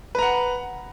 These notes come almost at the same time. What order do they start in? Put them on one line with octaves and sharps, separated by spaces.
B4 A#5 F#5